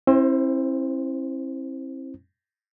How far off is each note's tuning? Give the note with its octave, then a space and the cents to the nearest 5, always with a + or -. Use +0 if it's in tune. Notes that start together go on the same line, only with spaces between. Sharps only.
C4 +40 E4 -10 C5 +0